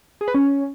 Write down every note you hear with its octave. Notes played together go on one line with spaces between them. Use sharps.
G#4
B4
C#4